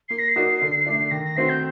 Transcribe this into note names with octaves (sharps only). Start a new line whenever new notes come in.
A#3 C7
A#6
C7
D#4 F#4 A#4 D5
D3
A3 D4
D#3 A#6
A#6
A3 C4 F#4 C5 C7
G6